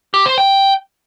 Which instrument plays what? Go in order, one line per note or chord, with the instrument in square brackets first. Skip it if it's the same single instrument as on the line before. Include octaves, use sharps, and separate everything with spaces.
[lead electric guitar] G4
C5
G5